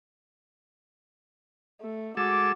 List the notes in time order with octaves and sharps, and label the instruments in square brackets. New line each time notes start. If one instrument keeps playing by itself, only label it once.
[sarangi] A3
[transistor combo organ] G#3 A4 E6 [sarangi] F#4 [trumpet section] D6